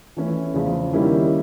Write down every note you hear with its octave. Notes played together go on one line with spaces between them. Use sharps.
E3 A3 C#4 E4
E2 C#3 F3
D#3 G3 A#3 C#4 E4